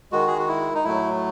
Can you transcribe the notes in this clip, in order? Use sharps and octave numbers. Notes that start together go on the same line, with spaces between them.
D#3 G#3 F#4
G#4
F#4
E4
D#4
A2 F#3 A3 E4